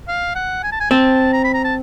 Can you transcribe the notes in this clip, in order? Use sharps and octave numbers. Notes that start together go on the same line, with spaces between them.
F5
F#5
G#5
A5
G#5
C4 A5
A#5
B5
A#5
A5